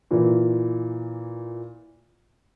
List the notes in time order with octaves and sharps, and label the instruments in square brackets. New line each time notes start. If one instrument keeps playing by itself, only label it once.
[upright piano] A#2 E3